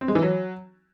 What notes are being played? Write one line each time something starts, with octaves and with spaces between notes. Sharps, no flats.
C4
G#3
E3
F#3